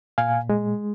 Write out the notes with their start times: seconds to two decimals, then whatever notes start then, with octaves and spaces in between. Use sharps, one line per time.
0.18 A#2 F5 G#5
0.50 G#3